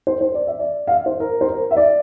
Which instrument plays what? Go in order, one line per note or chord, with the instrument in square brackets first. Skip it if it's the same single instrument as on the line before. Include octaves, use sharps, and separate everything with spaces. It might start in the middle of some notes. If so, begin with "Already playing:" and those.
[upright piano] C5
C5
D5
E5
D5
F5
E5
C5
A#4
C5
A#4
E5
D5